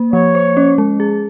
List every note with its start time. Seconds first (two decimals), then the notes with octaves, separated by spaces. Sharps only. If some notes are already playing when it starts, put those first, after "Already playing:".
Already playing: A#3
0.13 F3 C#5
0.35 C5
0.57 C#4
0.78 G#3
1.00 G#4